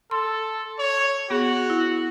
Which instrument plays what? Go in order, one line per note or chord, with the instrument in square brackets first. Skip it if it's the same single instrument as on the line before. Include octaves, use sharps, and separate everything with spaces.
[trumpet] A4 [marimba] C6
[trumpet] C#5
[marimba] B3 G#4 [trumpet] F#4
[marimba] E4